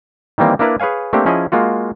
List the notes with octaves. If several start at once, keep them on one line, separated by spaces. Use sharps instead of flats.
D#3 E3 G3 A#3 C4
A#3 D4 E4 A#4 B4 D5
G#4 B4 C#5 F5 G#5
A3 A#3 C4 D4 G4
F3 C#4 E4 G#4 D#5
G#3 A#3 F4 F#4